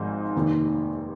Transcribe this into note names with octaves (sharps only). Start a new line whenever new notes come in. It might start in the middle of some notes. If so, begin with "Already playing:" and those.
Already playing: G#1 G#2 F3 G#3 D#4
F1 D#2 D#3